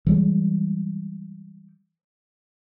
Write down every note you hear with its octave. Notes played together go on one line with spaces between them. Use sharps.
E3 G3 G#3